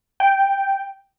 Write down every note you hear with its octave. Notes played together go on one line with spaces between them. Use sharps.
G5